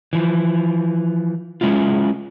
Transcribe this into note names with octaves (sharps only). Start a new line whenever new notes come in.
E3 F3
G#3 C#4 E4 F4